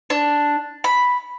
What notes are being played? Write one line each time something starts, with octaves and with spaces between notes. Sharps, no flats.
D4
B5